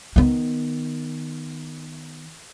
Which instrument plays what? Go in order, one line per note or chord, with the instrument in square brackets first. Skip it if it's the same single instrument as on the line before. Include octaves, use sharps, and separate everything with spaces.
[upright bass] D#3 B3